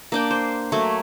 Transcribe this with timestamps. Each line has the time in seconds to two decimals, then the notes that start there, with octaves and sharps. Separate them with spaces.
0.12 A#3 D4 G5
0.31 C5
0.72 F#3 A3 A#3 C#5